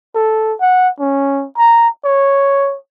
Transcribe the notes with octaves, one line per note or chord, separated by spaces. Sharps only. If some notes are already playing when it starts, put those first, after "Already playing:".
A4
F#5
C#4
A#5
C#5